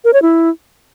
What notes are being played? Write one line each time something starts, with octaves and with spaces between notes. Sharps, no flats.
A#4
C#5
E4